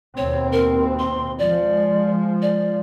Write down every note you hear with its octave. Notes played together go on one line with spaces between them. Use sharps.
D#2 B2 C4 C#5
A#4
C6
F3 G#3 D5
D5